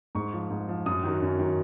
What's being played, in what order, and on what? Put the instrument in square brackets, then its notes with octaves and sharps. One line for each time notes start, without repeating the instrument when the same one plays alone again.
[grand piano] G#2 C#6
F3
G#2
F3
F#2 D#6
D#3 F#3
F#2
D#3 F#3